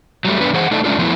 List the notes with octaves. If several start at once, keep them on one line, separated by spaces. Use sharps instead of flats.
F#3 G3 A3
F#2 B3 D4 B4
E3 G#4 C5 F#5
A3 D#4 E4 A4 D5 D#5
G#3 A3 C#4 D4 F4 A4
F3 A3 B3 C#4 E4